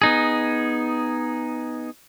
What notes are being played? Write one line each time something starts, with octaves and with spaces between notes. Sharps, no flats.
B3 D#4 G#4